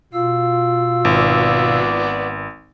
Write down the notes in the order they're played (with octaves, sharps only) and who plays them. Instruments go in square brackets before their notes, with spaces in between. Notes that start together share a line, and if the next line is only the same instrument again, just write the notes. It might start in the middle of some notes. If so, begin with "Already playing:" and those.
[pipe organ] B2 F5 E6 [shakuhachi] F4
[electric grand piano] G#1 [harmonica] B3 D5